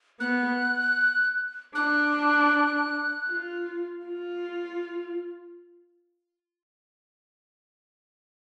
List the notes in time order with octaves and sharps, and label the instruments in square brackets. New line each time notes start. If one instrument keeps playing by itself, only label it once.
[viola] B3 [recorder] F#6
[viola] D4 [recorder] F#6
[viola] F4
F4